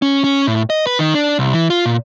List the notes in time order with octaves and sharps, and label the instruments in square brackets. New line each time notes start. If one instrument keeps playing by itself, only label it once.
[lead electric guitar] C#4
C#4
A2
D#5
B4
D#3
D4
C2
E3
F4
A#2